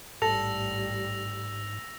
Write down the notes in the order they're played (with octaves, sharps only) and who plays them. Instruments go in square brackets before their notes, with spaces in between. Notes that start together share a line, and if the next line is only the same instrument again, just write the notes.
[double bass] A1 G3 [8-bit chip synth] G#2 [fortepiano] A4 [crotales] E6 A#6 F7